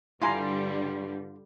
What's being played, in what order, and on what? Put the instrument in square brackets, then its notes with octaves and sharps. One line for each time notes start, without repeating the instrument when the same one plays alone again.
[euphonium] G2 [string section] D3 G3 [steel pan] E4 G#5 A#5 [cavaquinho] F4 C6